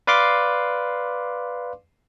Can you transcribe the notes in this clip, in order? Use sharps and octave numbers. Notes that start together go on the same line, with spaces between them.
B4 D5 F5 C6 D6